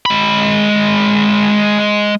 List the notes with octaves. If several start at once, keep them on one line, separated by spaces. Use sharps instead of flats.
G#3 B5